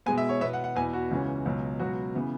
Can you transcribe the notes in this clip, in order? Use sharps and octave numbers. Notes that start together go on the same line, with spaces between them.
B2 G#3 B3 G#5
E5
C#5
B2 B3 E5
F#5
F#5
E2 B2 B3 G#5
F#4
C#2 C#3 E3 C#4
C#2 B2 F#3 C#4
C#2 B2 F#3 B3 F#4
C#3 E3 B3